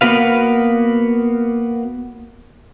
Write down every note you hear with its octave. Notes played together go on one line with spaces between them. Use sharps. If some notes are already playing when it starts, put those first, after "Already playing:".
A#3 B3 F#4 B4 F5